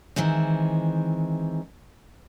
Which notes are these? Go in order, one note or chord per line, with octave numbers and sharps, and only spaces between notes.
D#3 E3 G#3 C4